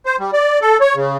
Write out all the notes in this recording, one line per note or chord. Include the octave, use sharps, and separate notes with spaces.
C5
G3
D5
A4
C#5
C#3